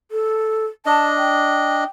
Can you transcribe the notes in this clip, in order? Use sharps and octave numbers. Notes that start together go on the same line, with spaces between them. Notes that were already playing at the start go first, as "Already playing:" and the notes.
A4
D4 D#5 A5
G5